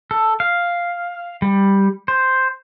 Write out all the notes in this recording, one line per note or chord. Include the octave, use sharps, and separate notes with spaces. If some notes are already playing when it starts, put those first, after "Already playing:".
A4
F5
G3
C5